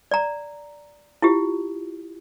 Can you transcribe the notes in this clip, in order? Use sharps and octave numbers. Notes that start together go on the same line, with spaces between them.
D5 A#5
E4 F4 G4